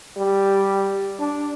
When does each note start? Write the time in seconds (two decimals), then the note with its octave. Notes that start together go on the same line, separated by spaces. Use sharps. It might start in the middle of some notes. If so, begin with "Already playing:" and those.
0.17 G3
1.20 D4